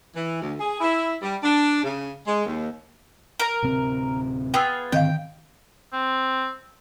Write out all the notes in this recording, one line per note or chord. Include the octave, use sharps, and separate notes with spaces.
E3
D2
G#4
E4
G3
D4
C#3
G#3
D#2
A#4 A#5
D1 C3 C4
B3 F4 G#4 G5 E6
G#2 D3 D#3 C4 D#5 F5 G5
C4